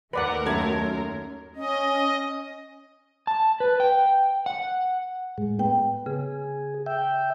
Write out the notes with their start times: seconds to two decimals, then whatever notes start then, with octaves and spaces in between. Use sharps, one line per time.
0.13 D#2 A3 A#4 B4 D5 F#5
0.46 F#2 A4 E5 G#6
1.56 C#4 D#5
3.27 A5
3.60 B4
3.80 G5
4.46 F#5
5.38 A2 G#3
5.59 B3 G5
6.06 C#3 G#4
6.86 E5 G5